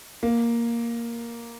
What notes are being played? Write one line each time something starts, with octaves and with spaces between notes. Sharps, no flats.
A#3